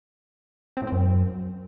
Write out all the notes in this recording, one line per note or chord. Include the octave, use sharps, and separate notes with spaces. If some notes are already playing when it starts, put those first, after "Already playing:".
C4
A2
C4
F#2